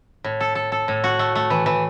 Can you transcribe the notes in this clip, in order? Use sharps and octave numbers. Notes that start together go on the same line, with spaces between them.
A2
A4
A4
A4
A2
F#4
A3
A3
E3
E3